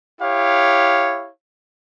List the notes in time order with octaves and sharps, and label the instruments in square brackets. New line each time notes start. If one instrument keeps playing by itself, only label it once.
[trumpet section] E4 G4 C#5 F5